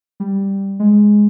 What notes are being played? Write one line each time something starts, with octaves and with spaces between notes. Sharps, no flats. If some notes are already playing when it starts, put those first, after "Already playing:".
G3
G#3